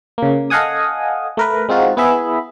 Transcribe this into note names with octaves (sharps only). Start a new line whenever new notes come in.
C#3 A#3
A4 D#5 F5 F#5 G#5 D#6
A3 A#4 B4
G#3 C4 D#4 F4 F#4
B3 E4 G#4 E5 B5